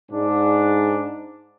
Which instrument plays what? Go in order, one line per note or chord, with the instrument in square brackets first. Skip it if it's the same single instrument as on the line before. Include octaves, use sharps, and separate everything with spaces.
[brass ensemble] G#2 D4